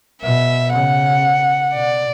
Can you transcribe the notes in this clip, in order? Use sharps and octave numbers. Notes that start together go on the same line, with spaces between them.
B2 E5
C#3 F#5
B2 D5